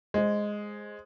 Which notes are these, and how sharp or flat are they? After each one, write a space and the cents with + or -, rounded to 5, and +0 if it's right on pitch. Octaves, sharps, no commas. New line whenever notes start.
G#3 +0 C5 +10